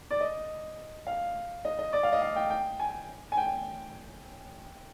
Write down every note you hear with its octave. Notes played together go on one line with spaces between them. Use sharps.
D5
D#5
F5
D#5
D#5
D5
F5
D#5
F5
G5
G5
G#5
G#5
G5